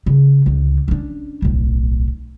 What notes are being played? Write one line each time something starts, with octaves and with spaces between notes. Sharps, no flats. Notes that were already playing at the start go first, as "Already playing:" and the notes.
C#3
C#2 D3
C#4 D4
D1 B1